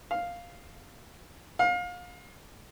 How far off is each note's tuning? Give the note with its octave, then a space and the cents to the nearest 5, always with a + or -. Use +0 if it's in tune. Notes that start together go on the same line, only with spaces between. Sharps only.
F5 +0
F5 +30